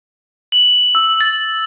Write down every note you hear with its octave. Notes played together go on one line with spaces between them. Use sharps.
F#7
E6
A6